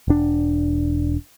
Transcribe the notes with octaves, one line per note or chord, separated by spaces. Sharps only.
E1 D4